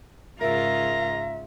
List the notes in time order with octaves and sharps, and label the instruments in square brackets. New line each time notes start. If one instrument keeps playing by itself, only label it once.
[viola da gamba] G#2 C#3 F4 [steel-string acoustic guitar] A#4 [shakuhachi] E5 [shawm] A#5